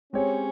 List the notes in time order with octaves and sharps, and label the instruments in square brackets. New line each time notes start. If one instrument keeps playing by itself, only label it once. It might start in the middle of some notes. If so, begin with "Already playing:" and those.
[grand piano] G#3 C4 G4 C#5 [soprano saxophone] C#4